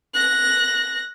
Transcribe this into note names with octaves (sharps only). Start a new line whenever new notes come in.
F#6 A#6